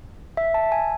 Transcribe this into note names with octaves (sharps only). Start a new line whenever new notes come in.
E5
A5
G#5